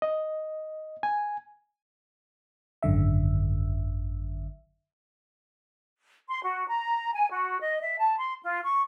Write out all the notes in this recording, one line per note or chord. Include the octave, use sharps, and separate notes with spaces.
D#5
G#5
G#1 F#2 D3 E5
C6
F#4
A#5
G#5
F#4
D#5
E5
A5
C6
F4
C#6